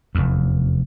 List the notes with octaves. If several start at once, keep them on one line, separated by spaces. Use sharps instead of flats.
F1 E2